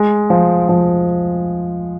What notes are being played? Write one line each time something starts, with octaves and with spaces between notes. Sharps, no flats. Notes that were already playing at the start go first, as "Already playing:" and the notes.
Already playing: G#3
F3
F3